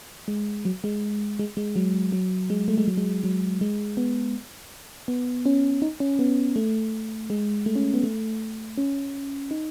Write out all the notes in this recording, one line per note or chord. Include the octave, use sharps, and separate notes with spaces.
G#3
F#3
G#3
G#3
G#3
F#3
F#3
G#3
A3
G#3
F#3
G#3
F#3
G#3
B3
B3
C#4
D#4
C#4
B3
A3
G#3
A3
C#4
B3
A3
C#4
D#4